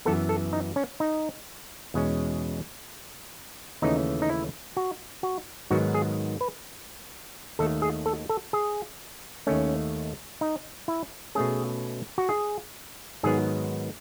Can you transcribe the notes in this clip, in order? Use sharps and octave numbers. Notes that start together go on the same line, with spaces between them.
F#2 E3 B3 A4
A4
D#4
C#4
D#4
E2 B2 G#3 C#4
D#2 C#3 E3 A3 C#4 D#4
D#4
E4
F#4
F#4
G#2 D#3 F#3 B3 F#4
G#4
B4
D#2 D#3 A3 A4
G#4
A4
A4
G#4
D#2 D#3 A3 C#4
D#4
E4
B2 A3 C#4 G#4
F#4
G#4
G#2 D#3 F#3 B3 G#4